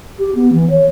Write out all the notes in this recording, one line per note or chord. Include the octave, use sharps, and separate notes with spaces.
G4
B3
E3
C#5